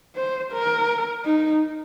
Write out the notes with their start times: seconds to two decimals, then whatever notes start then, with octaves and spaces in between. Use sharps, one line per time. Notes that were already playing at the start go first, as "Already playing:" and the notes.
0.16 C5
0.53 A#4
1.25 D#4